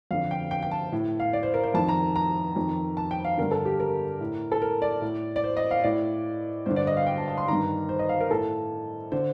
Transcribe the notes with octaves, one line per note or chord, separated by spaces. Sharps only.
F2 D3 F5
G5
G5
G5
A5
A2
F5
D5
C5
A#4
C5
F2 D#3 A5
A#5
A#5
F2 D#3
A5
G5
F5
G2 D3 A#4
A4
G4
A#4
A2
A4
A#4
D5
A2
D5
C5
D#5
F5
A2 D5
G2 D3 C5
D5
D#5
F5
G5
A5
A5
C6
G2 D#3 A#5
C5
D#5
F5
A#4
A2 A4
D3 C5